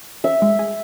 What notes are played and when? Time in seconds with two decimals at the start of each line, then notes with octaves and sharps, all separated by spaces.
0.24 C#4 E5
0.42 G#3
0.59 G#4